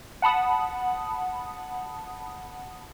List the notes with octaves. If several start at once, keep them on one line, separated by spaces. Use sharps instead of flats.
F#5 A5 B5 D#6